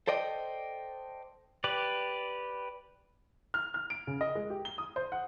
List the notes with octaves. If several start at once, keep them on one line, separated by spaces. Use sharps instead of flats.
A4 C5 D5 D#5 G5
G4 B4 D5
F6
F6
D7
C#3
D#5
G#3
G4
G7
D#6
C5
F#5